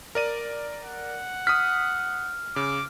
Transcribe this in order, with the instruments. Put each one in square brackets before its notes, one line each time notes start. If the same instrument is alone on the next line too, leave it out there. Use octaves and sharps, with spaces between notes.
[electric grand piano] A#4 D5 D#7
[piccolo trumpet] F#5
[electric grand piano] D#6 B6 [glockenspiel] F6
[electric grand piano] C#3 [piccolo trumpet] D6